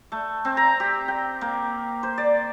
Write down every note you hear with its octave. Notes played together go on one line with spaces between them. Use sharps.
A3
C4
A#5
G4
G5
A#3
C5
D5